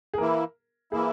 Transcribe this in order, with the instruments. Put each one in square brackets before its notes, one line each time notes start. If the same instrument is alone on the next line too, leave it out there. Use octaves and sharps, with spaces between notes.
[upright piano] G#4
[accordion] E3 A#3 E4 [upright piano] A#4
[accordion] E3 A#3 E4 [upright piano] G#4